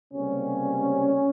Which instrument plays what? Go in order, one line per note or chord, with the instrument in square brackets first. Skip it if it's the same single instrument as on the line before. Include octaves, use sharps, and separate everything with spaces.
[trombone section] C#2 C3 G3 A#3 C#4